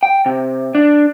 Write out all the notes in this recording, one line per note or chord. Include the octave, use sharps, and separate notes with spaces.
G5
C3
D4